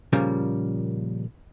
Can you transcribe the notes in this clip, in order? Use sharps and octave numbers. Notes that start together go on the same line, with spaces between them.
A#2 C#3 F3 G3 A#3